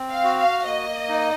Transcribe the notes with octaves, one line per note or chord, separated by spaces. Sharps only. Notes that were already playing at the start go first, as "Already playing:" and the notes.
Already playing: C4
F5
F#4
F5
A#3 D#5
D#4